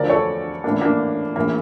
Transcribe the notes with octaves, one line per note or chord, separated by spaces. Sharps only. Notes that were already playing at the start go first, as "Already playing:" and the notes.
Already playing: E1 D2 D3 F3 A#4 D5
A4 C#5
A1 A2 E3 A#3 D4
A#3 D4
A#1 A2 E3 A#3